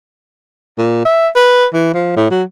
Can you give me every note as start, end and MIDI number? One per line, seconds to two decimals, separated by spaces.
0.78 1.01 46
1.05 1.28 76
1.35 1.65 71
1.73 1.90 52
1.94 2.12 53
2.16 2.29 45
2.31 2.43 54